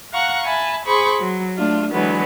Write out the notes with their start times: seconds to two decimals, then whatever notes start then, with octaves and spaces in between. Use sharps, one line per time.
0.12 F5 F#5 A#5 C#6 F#6
0.45 E5 G#5 A5 B5
0.86 G#4 C5 B5 C#6 D6
1.20 F#3
1.57 A3 D4 F4
1.92 D3 E3 F#3 G#3 B3